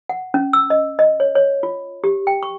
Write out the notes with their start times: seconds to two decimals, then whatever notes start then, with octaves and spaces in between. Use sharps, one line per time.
0.09 F#5
0.34 C#4
0.53 E6
0.70 D#5
0.99 D#5
1.20 C#5
1.35 C#5
1.63 F4
2.04 G4
2.27 G5
2.43 C#6